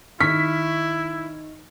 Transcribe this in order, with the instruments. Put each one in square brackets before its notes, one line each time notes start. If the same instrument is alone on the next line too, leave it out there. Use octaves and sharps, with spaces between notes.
[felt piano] D#3 [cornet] E4 [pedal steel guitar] C#6 F6 [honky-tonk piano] B6